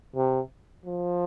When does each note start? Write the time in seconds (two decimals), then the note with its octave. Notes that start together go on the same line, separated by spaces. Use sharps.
0.16 C3
0.85 F3